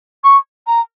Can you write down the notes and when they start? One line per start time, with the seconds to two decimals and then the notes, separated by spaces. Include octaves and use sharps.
0.24 C#6
0.67 A#5